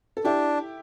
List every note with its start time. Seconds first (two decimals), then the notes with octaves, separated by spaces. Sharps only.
0.17 A4
0.24 D4 E4 G4